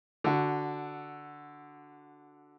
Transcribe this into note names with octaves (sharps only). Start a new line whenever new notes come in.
D3 F#4